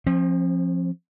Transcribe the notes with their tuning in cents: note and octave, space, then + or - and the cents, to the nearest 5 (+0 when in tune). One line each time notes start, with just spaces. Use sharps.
F3 +0 C4 +40